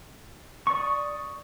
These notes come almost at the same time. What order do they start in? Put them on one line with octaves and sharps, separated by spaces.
C#6 D5 D#6